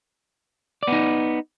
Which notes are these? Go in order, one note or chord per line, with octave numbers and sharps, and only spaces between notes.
B3 D#4 D5